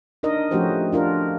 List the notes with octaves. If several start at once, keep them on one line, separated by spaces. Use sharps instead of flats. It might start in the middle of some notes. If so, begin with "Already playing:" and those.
D4 D#4 A#4 D#5
F3 A3 C#4 F#4 G4 C5
D4 F4 A#4